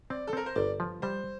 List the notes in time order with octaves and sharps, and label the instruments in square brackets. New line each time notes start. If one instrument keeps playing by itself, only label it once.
[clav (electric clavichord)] C4 [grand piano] D5
[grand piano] A4
[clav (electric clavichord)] C4 [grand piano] A#4
[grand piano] C5
[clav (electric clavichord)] G1 [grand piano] D5
[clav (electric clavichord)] F3
[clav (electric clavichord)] G3 [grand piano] C5